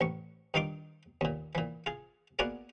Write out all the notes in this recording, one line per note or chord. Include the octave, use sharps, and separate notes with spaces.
A1 C#6
G2 D#3 D#4 F4 C6 D6
D#2 A#2
A#2 E3
F4 G#4
A#3 B3 F#4 G#4 D5 D#5